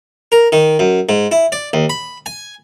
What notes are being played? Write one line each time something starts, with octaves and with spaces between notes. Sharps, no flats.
A#4
D#3
F#2
G#2
E4
D5
D#2
B5
G#5